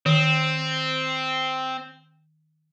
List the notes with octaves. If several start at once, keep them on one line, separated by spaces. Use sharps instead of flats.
D#3 C4